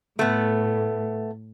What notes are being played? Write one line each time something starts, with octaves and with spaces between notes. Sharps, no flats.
A2 A3 B3